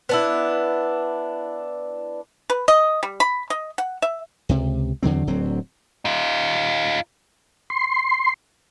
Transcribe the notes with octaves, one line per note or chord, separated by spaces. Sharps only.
B3 D4 E4
B4
D#5
G3
B5
D#5
F#5
E5
C#2 C3
E2 D3 F#3 C4
D1 D3 F#3 C4
D#4 F4
C6